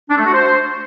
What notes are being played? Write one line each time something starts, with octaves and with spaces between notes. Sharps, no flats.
D4
A3
F#4
C5